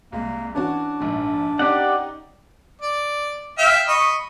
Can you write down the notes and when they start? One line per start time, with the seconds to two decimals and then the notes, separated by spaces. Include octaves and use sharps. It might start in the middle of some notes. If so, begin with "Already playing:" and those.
0.12 C2 G#3 A#3
0.55 E3 C#4 D4 F#4
1.00 A#1 G#2
1.59 C#4 D#4 G4 D5 F#5
2.81 D5
3.58 E5 F5 G5
3.88 D#5 B5 C#6